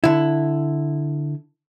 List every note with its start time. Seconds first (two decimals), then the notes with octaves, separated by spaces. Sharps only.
0.04 D3 E4